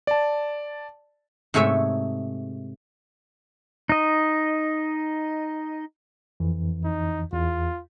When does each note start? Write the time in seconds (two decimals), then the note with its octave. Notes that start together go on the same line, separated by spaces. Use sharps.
0.07 D5 A5
1.54 G#2 C3 A3 G#4 C#5 E5
3.89 D#4 D#5
6.40 F2 E3
6.84 D#4
7.33 E2 F4